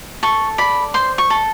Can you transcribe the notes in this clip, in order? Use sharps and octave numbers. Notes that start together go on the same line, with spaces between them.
A4 C#6
D5 B5
C5 C6
C#6
A4